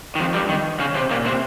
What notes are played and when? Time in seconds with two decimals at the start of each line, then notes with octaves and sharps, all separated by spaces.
0.15 D#3
0.19 F2 F3
0.34 G2 G3
0.49 D#3
0.79 C#3 C#4
0.95 C3 C4
1.10 A#2 A#3
1.26 C3 C4